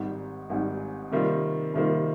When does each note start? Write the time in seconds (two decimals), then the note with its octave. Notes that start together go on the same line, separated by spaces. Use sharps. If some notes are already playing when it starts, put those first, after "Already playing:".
Already playing: G#1 G#2 G3
0.50 G#1 G#2 G3
1.11 C3 D#3 G3 A#3 F4
1.74 C3 D#3 G3 A#3 F4